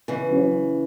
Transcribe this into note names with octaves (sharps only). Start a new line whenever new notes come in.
C#3 E3
F#3 C#4 F#4 C#5